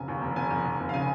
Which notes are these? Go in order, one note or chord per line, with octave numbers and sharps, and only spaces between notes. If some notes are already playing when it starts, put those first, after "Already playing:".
Already playing: F1 C#3 G#5
D#2
F1
F1 G#5
F1
F1
F1
F5
C#3 G#5